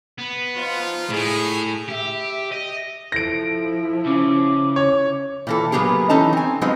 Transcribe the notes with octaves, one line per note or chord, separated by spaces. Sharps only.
B3
F3 D#4 F4
A2 G#4
G4 E5
D#5
F3 E4 A4 A#6 D7
C#3 C#4 D6
C#5
A#2 E3 A4
F#3 A#3 B3 G4 G#4
E3 C#4 D#4 A4 A5 A#5
C4 G#5
F3 F#3 G#3 B3 C4 D#4